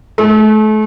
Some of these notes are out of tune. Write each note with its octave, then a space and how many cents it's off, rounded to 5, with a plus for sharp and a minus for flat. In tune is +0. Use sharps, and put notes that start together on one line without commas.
A3 -35